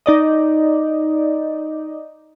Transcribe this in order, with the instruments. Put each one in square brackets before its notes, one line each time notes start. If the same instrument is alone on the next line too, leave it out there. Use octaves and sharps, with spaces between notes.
[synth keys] D#4 D5 D#5